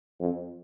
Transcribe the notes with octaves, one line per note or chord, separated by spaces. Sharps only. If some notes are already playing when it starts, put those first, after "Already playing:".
F2